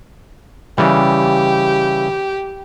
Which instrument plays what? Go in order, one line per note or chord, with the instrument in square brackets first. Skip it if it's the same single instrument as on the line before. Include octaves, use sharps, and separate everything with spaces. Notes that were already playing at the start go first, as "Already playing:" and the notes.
[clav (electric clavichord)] C#3 E3 G3 [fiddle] G4